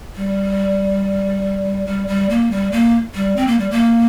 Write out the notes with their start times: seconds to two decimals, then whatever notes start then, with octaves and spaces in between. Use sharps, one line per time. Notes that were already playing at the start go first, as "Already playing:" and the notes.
0.16 G3
1.86 G3
2.08 G3
2.29 A#3
2.51 G3
2.72 A#3
3.15 G3
3.36 C4
3.47 A#3
3.59 G3
3.71 A#3